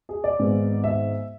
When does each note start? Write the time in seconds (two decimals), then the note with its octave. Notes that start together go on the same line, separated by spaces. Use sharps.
0.09 G#4
0.24 D5
0.39 G#1 G#2 G#3 B3
0.84 E5